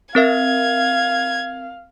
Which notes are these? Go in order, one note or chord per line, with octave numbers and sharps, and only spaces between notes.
C4 A#4 E5 F5 G#6